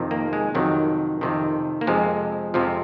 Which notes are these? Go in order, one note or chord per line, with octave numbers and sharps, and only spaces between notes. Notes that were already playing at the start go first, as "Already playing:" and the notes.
Already playing: F2 C3 D#3
A#3
G#3
F2 C3 D#3 F#3
F2 C3 D#3
A#3
F2 C3 F3 G#3
F2 C3 F3